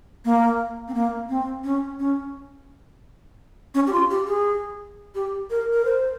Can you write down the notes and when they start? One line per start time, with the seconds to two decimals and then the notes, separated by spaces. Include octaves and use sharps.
0.25 A#3
0.88 C4
0.94 A#3
1.29 C4
1.64 C#4
1.99 C#4
3.74 C#4
3.87 G4
3.93 F4
4.10 G4
4.27 G#4
5.15 G4
5.50 A#4
5.73 A#4
5.85 C5